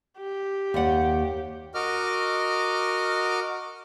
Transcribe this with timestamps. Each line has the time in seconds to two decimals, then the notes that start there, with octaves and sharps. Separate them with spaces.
0.18 G4
0.74 D#2 D5 F#5
1.75 F#4 A#4 D#5 D6 F6